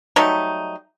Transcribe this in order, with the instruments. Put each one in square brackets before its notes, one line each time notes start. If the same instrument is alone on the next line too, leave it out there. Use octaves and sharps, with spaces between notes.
[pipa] F#3 G3 A3 D#4